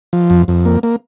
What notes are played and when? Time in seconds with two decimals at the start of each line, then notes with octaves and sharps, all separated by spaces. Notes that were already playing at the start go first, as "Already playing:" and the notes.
0.13 F3
0.30 F2
0.48 F2
0.65 A#3
0.83 A#3